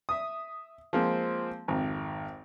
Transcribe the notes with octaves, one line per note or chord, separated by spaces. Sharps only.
E5 D#6
F3 G#3 A#3 C4
G#1 F2